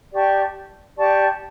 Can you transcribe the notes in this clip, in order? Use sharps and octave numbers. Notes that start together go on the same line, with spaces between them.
G4 D5 A5 C#6
G4 D5 A5 C#6